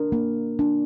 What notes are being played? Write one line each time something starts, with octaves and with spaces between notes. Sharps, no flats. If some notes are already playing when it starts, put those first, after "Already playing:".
Already playing: D4 A#4
A#3
D4